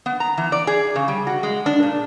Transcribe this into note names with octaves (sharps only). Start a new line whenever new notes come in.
B3
A#5
E3
D5
G#4
C#3
G3
F#4
G#3
D4
A#2